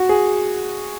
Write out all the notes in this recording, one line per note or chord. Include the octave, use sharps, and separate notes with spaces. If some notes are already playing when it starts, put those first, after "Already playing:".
Already playing: F#4
G#4